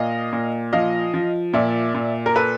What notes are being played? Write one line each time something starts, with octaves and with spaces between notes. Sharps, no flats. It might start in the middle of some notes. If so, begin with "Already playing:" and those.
Already playing: A#2 D#5 F5
A#2
F3 D#5 F5
F3
A#2 D5 E5
A#2
A#4
A4 B4